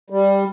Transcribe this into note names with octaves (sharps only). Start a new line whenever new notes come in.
G3